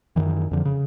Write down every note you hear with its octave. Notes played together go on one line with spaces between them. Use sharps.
F#2 D#3 E3
F2 D3 F3
C#3